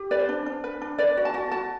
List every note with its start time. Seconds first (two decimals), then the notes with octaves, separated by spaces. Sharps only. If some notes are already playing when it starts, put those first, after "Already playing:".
Already playing: G4
0.11 B4 D5
0.19 C5
0.29 D4
0.46 D4
0.64 B4
0.81 D4
0.98 B4 D5
1.17 F#4
1.25 A5
1.34 F#4
1.51 F#4 A5